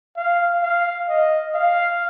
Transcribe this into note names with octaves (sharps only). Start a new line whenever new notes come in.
F5
F5
D#5
F5